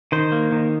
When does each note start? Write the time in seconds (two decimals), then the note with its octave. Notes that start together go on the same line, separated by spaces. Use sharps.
0.12 D#3 C5
0.32 A#3
0.52 D#3